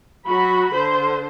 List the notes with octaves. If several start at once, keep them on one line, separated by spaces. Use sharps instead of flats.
F#3 F#4 B5
D3 C5